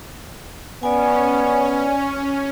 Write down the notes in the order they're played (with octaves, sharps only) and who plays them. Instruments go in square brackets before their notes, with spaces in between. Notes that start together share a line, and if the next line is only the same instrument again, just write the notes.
[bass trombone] B3 [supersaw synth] C#4 [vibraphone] D5 G#5